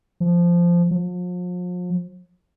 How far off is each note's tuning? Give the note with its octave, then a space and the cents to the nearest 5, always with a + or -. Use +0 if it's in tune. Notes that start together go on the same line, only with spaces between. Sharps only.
F3 -10
F3 +40